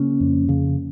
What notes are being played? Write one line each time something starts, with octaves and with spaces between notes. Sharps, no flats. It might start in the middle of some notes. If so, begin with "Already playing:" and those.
Already playing: C#3 A#3 C#4
F2
C#3